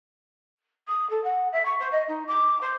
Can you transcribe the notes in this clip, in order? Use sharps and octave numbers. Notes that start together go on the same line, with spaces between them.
D#6
A4
F#5
E5
C#6
C5
D#5
D#4
D6
C5